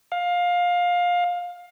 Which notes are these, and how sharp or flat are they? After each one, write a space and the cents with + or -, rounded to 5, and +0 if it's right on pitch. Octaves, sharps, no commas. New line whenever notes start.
F5 +20